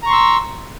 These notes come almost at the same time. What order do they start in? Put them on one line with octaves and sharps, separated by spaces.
A#5 C#6 C6 E6